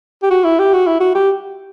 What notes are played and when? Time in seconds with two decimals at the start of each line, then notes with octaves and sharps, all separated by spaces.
0.23 G4
0.30 F#4
0.44 E4
0.59 G4
0.73 F#4
0.87 E4
1.00 F#4
1.15 G4